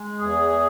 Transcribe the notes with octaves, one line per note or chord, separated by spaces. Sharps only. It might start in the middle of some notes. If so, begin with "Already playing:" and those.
Already playing: G#3
E2 G#4